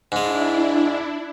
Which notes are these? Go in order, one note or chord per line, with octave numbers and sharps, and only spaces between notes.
G#2 G#3 D4 E4